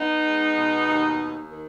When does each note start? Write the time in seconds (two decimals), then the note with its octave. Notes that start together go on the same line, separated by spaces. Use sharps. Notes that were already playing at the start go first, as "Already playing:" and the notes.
Already playing: B3 D#4
0.25 G#3
0.57 B2
0.88 D#2
1.20 D#2
1.51 D#3